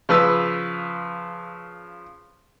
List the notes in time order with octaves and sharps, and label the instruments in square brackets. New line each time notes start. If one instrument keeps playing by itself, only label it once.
[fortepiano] C#3 F3 B4 E6